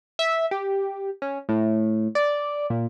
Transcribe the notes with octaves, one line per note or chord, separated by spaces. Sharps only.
E5
G4
C#4
A2
D5
A#2